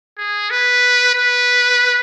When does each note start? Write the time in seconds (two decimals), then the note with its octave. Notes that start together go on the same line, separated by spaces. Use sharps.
0.18 G#4
0.50 B4
1.15 B4